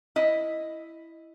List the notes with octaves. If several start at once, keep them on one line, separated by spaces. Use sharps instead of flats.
E4 D#5